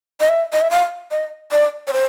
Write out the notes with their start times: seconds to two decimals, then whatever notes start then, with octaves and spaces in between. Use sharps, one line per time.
0.20 D#5
0.29 E5
0.53 D#5
0.61 E5
0.71 F5
1.11 D#5
1.52 D5
1.88 C#5
1.93 C5